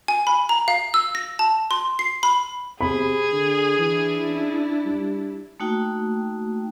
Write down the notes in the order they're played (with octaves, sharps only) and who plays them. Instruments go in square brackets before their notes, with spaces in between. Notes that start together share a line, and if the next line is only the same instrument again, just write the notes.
[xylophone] G#5
B5
A#5
F5
E6
A#6
A5
C6
C7
B5
[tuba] C3 [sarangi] G#4 [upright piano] B5
[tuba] D3
[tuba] E3 [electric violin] D4 E4
[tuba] C#4
G3
[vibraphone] A3 A#3 D#4 F#4 G5